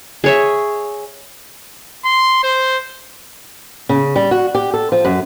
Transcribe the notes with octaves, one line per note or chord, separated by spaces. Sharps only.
G#4 C#5 E5
C6
C5
C#3
G3
F#4
G4
A4
F3
F#2